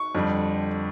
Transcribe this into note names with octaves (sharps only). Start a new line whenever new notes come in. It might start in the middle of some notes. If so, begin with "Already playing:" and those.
Already playing: C#6
F2 D3 G3